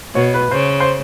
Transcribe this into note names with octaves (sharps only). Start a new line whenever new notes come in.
B2 C#5
B4
C#3 C5
C5